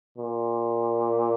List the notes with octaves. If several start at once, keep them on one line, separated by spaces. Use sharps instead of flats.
A#2